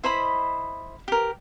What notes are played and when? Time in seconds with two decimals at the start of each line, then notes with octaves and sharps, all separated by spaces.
0.04 E4 C5 D#5 B5
1.08 G4 A#4